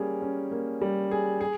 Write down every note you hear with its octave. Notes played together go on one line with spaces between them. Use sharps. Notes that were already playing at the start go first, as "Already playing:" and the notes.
Already playing: G3 A#3 C#4 G#4
C#4
A#3
G3
G#4
G#4